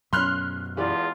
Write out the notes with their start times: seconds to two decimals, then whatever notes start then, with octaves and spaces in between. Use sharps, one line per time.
0.13 F#2 B2 F#3 C#4 B5 C6 F6 F#6
0.77 E2 E3 G#3 F4 G4 D5